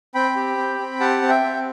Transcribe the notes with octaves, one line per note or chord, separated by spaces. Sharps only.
C4 G5 B5
G4
C4
C4
G4 F#5 A5
C4
E5 G5
C4